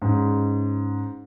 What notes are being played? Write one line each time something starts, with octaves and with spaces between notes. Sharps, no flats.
G#2 C#4